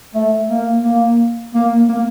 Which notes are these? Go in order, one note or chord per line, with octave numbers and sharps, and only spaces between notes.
A3
A#3
A#3
A#3
A#3